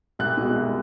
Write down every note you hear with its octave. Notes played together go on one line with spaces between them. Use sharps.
C2 F#6
B2 G#3
C2